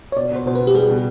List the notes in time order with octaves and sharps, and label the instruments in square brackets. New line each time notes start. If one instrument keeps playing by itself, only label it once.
[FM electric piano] C#5
[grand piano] B2 [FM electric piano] D5
[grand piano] B2 [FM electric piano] C5
[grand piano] B2 [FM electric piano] C5
[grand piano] B3 [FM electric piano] B4
[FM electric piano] G4
[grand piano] G3 [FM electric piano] G#4
[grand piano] B2